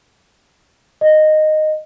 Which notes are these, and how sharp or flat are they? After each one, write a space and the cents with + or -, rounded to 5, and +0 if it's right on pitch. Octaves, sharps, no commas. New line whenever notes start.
D#5 -10